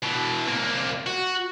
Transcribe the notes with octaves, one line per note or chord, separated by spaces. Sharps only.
B2 E3
C3 A#3
F#4